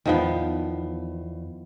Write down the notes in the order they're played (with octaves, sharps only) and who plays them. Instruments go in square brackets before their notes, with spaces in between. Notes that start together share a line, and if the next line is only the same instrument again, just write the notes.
[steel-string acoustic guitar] E2 [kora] D#3 F3 B3